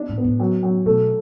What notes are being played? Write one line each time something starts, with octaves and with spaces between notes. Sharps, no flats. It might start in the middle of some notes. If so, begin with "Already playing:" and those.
Already playing: D4
A2
B3
A2
F#2
F#2
B2 A3